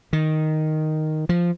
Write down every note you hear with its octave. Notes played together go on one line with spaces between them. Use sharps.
D#3
F3